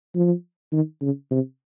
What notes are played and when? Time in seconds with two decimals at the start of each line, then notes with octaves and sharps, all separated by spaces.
0.15 F3
0.72 D#3
1.02 C#3
1.31 C3